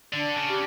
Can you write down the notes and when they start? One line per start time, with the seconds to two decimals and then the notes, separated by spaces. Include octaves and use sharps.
0.13 D3 D4
0.37 C#3
0.49 G4